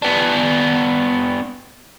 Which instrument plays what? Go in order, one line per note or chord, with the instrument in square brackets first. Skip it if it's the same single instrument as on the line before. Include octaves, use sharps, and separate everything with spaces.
[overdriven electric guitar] B3 D4